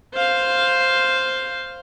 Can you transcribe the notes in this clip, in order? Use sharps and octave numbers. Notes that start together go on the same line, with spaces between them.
C5 F5